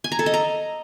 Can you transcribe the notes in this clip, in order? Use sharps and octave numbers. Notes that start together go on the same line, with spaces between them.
G#5
A#5
A4
D#5
A#5